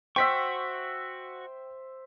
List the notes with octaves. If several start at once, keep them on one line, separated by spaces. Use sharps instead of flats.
F#4 C5 E5 G5 C#6 B6